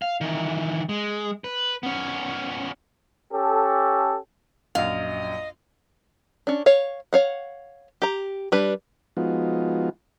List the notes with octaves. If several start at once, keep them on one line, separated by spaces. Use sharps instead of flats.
F5
D#3 E3
G#3
B4
B3 C#4
C#4 G4 A4
A#1 F#2 D#5 F5
C#4 D4
C#5 F5
C#5 F5 F#5
G4 A#5
G3 D4 B4
F3 G#3 B3 D#4 F4 F#4